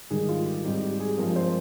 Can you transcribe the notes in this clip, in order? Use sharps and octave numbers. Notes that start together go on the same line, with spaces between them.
G#2 D#3 G3 G#4
F4
G4
G#2 G3 C4 D#4 G4
G4
G#4
G2 F3 G#3 C4 A#4
C5